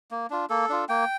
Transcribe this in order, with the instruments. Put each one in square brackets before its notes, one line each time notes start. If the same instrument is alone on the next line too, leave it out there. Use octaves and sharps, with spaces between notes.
[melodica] A#3
D4 F4
A#3 A4
D4 F4
A#3 G5